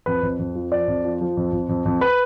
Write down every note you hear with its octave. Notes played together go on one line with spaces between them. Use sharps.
F2 B4
F2
F2
F3
F3 D5
F2
F3
F3
F2
F2
F2
F2
B4